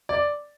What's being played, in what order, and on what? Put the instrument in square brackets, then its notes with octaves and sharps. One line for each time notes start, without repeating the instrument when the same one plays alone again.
[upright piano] D5